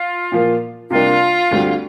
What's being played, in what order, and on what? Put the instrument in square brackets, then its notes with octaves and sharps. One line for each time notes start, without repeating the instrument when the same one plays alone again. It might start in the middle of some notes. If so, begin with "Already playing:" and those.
Already playing: [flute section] F4
[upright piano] A#2 F3 A#3
[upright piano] C3 G3 A#3 D4 [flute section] F4
[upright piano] D2 D3 G3 C4